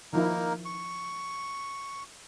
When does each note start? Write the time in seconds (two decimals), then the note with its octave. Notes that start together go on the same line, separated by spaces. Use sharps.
0.13 D#3 F3 A#3 D#4 E4 A#4
0.65 C#6